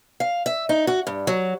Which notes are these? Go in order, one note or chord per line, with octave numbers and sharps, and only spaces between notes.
F5
E5
D#4
F#4
G2
F#3